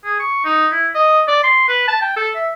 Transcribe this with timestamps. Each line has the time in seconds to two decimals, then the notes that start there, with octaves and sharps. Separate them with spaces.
0.04 G#4
0.20 C#6
0.45 D#4
0.72 E4
0.95 D#5
1.28 D5
1.44 C6
1.68 B4
1.88 A5
2.01 G5
2.17 A4
2.35 E5